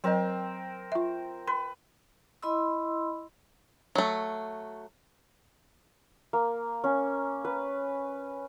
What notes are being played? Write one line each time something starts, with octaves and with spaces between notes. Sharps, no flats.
F#3 C4 A#4 D#5 G5
F4 E5
B4 C6
E4 D#5 B5 C6 E6
F#3 A3
A#3
C#4
B4